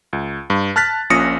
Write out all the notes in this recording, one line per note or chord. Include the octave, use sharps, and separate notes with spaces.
C#2
G2
A5 F6 F#6 A6 B6
A#1 A#2 C#4 D#6 A#6 C#7